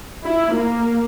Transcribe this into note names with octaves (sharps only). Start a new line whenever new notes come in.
E4
A#3